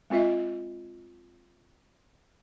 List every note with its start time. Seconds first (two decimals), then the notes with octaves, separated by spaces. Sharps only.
0.10 G#3 C4 F4 D#5 E5